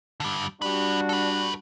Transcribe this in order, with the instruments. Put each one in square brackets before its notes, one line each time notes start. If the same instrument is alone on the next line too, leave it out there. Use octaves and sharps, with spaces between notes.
[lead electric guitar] D3 G3
[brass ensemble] G3 D4 F#4 [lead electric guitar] G4 B4
[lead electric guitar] A4 B4